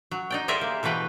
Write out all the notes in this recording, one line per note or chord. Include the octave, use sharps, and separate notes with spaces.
F#3
D#4 D5 G5
G4 G#4 A#4 C5 D5 E5
A#3
B2 E3 A3 B4 G5